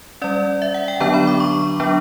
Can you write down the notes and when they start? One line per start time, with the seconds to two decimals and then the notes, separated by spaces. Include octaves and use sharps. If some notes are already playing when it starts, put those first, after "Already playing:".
0.22 G3 C#4 D5
0.62 E5
0.74 F#5
0.88 G5
1.00 D3 F#3 B3 D4 A#5
1.14 B5
1.27 D6
1.40 C#6
1.80 F#3 B3 D4